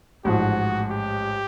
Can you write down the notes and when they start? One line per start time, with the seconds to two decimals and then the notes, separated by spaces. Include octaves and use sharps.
0.24 A1 G#2 F3 F#4
0.91 G4